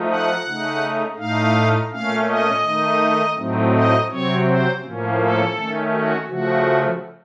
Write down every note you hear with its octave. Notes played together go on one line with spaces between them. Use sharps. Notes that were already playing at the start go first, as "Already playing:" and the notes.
Already playing: F3 A3 D#4
F#5
C#3 A3 D#4
A2 A3 D#4 F5
A#2 A3 C#4 F5
D#5
D#3 A3 D#4
A2 F#3 A3 C4 D#4
D#5
C3 F#3 C4 C#5
C5
A2 F3 A#3 C#4
A4
D#3 A3 C#4
F#4
C#3 F3 A3 F#4